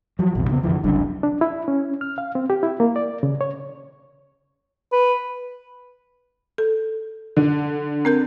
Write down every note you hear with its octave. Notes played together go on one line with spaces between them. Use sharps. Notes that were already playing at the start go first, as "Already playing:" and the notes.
F3 F#3
A#1 E2 C3
C#3 B3
F#2 D3 E3 F3
F#1 C2 F#2 D4
D4
E4
C#4
F6
F5
C4
G4
E4
A#3
D5
C#3
C#5
B4
A4
D3
C4 A#4 G6